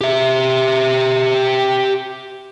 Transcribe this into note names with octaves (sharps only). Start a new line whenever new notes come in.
G4 E5